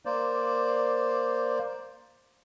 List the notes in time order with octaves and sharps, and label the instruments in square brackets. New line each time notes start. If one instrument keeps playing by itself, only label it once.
[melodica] A#3 C5 D5